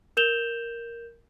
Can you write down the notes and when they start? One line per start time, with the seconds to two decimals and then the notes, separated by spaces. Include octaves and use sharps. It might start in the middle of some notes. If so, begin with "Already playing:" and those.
0.17 A#4 G6 E7 F7 G7